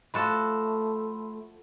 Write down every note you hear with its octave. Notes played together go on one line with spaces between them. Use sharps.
F3 A3 F#4 A4 B5 C6